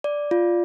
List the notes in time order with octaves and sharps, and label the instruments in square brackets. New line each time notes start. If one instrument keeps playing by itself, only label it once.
[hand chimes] D5
F4